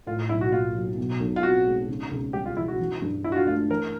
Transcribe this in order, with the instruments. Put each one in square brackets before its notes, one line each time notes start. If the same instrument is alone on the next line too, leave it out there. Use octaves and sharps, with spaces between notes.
[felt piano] A2 [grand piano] F4
[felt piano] B1 [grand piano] E4
[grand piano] F#4
[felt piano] A#3 [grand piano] F4
[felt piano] F#3
B2
B1
[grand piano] F4
[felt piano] C4 [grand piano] F#4
[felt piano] G#3
C#3
C#2
[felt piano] G3 [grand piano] G4
[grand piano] F4
[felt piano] E3 [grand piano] E4
[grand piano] F#4
[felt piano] E3
G2
[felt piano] D4 [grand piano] E4
[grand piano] F#4
F4
[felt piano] A3 [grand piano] F4
[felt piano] E3 [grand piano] A#4